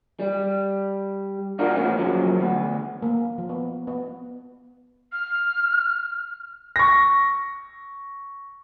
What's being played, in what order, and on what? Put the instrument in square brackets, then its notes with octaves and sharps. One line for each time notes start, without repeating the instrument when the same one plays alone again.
[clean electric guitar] G3
D4 F4 F#4 A#4
A2 B3 C#4
F#2 C#3 F3 F#3
D2 B3
[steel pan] A#3
F3
B3
B3
[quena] F6
[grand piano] C#6 A#6